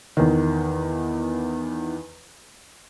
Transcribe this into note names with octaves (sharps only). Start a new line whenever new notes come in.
E2 D#3